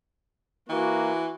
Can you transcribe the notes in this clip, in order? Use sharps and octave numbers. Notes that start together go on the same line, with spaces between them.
E3 A#3 F#4